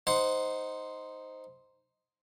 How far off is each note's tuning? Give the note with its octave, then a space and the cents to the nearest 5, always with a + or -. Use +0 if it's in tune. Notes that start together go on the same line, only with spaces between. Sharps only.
D#4 +0 C5 +0 F#5 +0